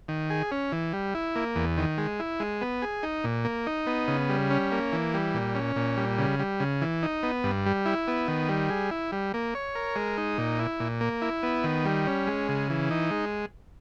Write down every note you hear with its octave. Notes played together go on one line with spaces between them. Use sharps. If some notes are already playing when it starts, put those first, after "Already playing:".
D#3
G#4
C#4
E3
G3
E4
A#3
E2
D#3
G#3
E4
G#3
B3
G#4
D#4
A#2
A#3
D#4
B3
C#3
G3
C#4
A#3
E3
G3
A#2
C#4
A#2
G3
C#3
G3
C#3
E3
D#4
B3
G2
G3
E4
B3
D#3
G3
G#4
E4
G3
A#3
C#5
A#4
G#3
D#4
A#2
E4
A#2
A#3
E4
B3
D#3
G3
C#4
G#3
C#3
E3
D#4
G#3